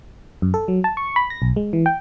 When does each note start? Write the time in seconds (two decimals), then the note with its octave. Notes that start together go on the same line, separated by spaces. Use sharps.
0.42 F#2
0.54 A4
0.68 F#3
0.84 A5
0.97 C#6
1.16 B5
1.30 A#6
1.42 B1
1.56 G#3
1.73 E3
1.86 G5